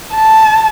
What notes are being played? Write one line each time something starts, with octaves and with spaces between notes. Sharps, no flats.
A5